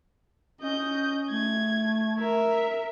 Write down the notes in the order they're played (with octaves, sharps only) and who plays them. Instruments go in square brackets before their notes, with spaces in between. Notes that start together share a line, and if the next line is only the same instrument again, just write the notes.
[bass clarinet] C#4 [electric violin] D#5 G6
[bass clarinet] A3 [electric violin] G#6
[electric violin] A#4 E5